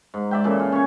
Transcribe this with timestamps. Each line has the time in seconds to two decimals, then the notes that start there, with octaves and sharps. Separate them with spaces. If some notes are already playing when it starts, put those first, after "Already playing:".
0.14 G#2
0.31 D5 E5 G5
0.44 A#2 C#3 E3 A4
0.60 F4
0.72 C#4 C#5